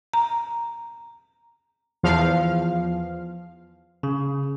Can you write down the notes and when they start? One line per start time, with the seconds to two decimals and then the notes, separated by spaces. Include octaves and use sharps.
0.13 A#5
2.03 E2 F3 F5
4.03 C#3